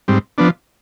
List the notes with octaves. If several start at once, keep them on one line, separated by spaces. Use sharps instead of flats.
G#2 G3 C4
F3 B3 D4